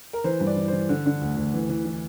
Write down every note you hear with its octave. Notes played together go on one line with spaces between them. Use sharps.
A#4
E3 C5
G2
D5
E3
E3 C5
D3
D3
D2
D2
E3
E3
E3